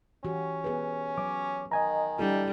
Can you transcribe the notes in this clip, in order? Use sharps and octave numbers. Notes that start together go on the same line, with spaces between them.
E3 C#4 F#4 G4
B3 G#4 B4
F#3 C#5 D6
D#3 D#5 G#5 A#5
G3 D4 E4 A4